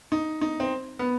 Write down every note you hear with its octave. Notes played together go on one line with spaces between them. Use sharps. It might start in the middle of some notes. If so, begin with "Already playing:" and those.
D#4
D#4
C4
B3